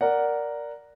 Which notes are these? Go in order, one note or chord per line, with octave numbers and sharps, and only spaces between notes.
A#4 D5 F#5